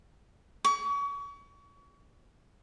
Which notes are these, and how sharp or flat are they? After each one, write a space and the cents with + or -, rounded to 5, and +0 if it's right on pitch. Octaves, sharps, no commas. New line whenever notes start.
C#6 +35